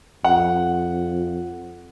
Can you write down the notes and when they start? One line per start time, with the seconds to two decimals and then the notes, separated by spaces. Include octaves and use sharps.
0.25 F2 F#5